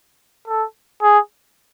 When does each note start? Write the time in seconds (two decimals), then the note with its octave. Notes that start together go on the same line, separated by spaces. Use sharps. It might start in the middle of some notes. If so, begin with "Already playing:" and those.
0.47 A4
1.02 G#4